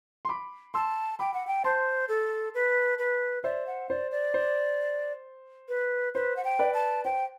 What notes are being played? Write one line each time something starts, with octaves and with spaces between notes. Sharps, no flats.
C6
B5 D6
A5 C6 E6
G5 B5 D6
F#5
G5
C5 A5 C6
A4
B4
B4
C5 D5 E5
F#5
C5 D5
D5
C5
B4
B4 C5
F#5
G5
B4 D5
A5
C5 G5